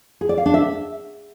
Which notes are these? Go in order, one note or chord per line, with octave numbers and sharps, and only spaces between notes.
G#4
D5
F5
D4
E5